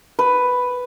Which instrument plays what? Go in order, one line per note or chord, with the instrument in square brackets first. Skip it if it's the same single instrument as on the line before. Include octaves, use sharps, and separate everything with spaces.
[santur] B4